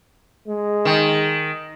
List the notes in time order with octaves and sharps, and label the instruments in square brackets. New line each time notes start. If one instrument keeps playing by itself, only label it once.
[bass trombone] G#3
[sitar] D#3